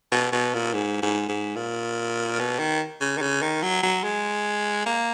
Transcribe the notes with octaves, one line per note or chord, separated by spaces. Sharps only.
B2
B2
A#2
G#2
G#2
G#2
A#2
B2
D#3
C#3
D#3
C#3
D#3
F#3
F#3
G#3
A#3